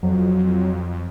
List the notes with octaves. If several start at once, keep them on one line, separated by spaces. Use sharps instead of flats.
F2 F#3